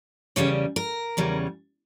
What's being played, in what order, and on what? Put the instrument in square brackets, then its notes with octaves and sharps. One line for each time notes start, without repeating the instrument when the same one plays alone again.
[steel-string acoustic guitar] E2 C#3 G3 C#4 C#5
A#4
E2 C#3 G3 C#4